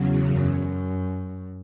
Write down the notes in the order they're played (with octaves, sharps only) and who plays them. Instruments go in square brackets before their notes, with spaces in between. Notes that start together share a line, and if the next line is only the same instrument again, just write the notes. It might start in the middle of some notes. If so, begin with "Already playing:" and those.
Already playing: [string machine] E2 C#3 F#3
[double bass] F#2